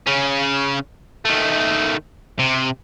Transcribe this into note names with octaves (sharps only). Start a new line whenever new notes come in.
C#3 C#4
D#3 A3
C3